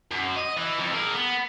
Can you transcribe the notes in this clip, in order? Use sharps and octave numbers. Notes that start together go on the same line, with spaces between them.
F#2
D#5
E3
F2
G#4 A#4
B3